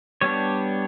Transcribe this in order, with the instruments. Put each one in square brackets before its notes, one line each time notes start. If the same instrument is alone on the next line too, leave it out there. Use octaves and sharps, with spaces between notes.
[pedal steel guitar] G3 B3 D4 C#5